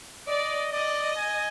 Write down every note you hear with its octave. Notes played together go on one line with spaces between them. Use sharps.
D5 D#5
D5 D#5
G#5